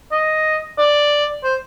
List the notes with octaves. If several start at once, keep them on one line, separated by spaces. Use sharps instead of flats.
D#5
D5
C5